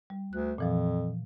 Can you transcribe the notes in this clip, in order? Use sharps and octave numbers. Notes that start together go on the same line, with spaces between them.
G3
D2 F#6
F2 A#2 E3 F3